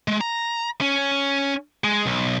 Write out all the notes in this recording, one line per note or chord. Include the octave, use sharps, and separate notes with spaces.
G#3
A#5
C#4
G#3
B1